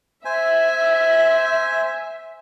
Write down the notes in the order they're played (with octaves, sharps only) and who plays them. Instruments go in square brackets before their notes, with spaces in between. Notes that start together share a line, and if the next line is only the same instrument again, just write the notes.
[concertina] C5 G#5 [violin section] E5